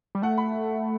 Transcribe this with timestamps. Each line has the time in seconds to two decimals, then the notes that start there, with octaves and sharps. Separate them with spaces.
0.15 G3
0.22 A3 F#5
0.37 B5